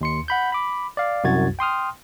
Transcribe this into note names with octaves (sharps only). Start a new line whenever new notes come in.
D#2 C6 C#7
F#5 B5 G6
B5 D6
D5 F5
C2 F#2 F#4 G#6 A6
G5 C6 D#6 F6